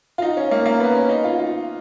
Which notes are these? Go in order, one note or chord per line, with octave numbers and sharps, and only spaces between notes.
F4
D#4
C#4
A#3
A#3
B3
C#4
D#4
F4
F4